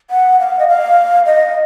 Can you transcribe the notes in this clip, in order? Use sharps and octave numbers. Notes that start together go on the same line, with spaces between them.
F#5
F5
D#5
F5
D#5